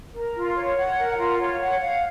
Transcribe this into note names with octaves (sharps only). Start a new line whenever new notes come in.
A#4
F4
C#5
F#5
A#4
F4
C#5
F#5
F5